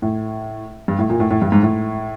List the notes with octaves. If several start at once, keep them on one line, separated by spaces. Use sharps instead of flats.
A2
G2
A2
A#2
A2
A2
G2
G#2
A2